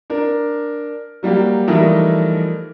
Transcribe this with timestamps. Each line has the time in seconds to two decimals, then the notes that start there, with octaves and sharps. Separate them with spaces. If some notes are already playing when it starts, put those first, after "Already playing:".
0.10 D4 A#4
1.23 F#3 G3 A#3 F#4 G4
1.67 E3 F3 G3 A3 D#4 A#4